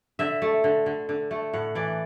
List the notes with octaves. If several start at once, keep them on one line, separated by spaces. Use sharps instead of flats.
D3 E5
A3
D3
D3
D3
A3
A2 F#5
E3 D5